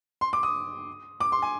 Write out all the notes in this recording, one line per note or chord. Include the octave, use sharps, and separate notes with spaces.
C6
D6
D#6
D6
C6
G#5